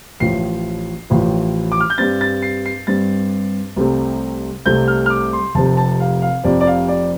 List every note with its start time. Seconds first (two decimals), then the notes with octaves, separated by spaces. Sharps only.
0.20 A1 A2 F3 C7
1.10 A1 A2 F3
1.72 D6
1.80 F6
1.90 G6
1.98 G2 G3 C4 A6
2.21 A6
2.43 C7
2.66 C7
2.87 G2 G3 C4 A6
3.76 C2 C3 A3 C4
4.66 C2 C3 A3 C4 G6
4.88 F6
5.06 F6
5.10 D6
5.33 C6
5.55 F1 F2 C3 A5
5.77 A5
6.00 F5
6.22 F5
6.44 F1 F2 C3 D5
6.61 D5
6.67 F5
6.88 D5